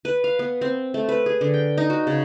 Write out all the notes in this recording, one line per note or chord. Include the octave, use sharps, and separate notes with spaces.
B4
F5
B3
C4
A3
B4
G#4
D3
G5
D#4
F#4
C#3